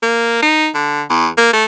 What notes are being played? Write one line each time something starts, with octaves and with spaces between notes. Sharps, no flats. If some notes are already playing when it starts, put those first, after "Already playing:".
A#3
D#4
D3
E2
A#3
A3